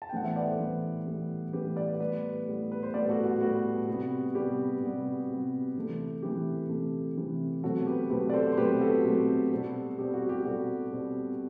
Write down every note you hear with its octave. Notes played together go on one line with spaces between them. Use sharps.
A5
G5
A2 E3 G3 B3 F#5
C5 E5
B4 D5
A4 C5
A2 E3 G3 B3
A2 E3 G3 B3
A2 E3 G3 B3 G4 B4
B4 D5
A2 G3 B3 B4 D5
A2 G3 B3
B4
C5
A2 G3 B3 B4 D5
F#4 A4
F#4
A2 G3 B3 F#4
C3 G3 B3
C3 G3 B3 G4
C3 G3 B3
C3 G3 B3
C3 E3 A3
C3 E3 A3 G4
C3 E3 A3
C3 E3 A3
B2 F#3 A3 C4 F#4 A4
G4 B4
B2 F#3 A3 C4 G4 B4
D5
A4 C5
C5
B2 F#3 A3 C4 G4 B4
F#4 A4
B2 F#3 A3 C4
B2 G3 C4
B2 G3 C4 G4
F#4
G4
B2 G3 C4 F#4 A4
B2 G3 C4